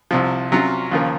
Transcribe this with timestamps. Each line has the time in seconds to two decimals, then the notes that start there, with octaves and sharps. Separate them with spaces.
0.11 C2 C3 F3
0.52 C3 F#3 C#4 F4
0.92 D#2 C#3 F3 A#3